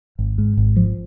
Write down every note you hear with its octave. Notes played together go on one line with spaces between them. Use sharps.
G#1
G#2
G#1
F3